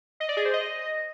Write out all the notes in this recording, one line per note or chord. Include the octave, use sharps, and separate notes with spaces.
D#5
D5
G#4
C5
D#5